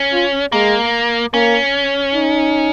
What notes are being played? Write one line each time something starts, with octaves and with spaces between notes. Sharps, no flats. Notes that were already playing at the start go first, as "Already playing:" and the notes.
Already playing: C#4
F4
G#3 A#3
A#3 C#4
D#4